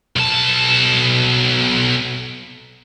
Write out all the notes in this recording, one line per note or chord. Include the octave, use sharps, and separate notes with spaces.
B1 A5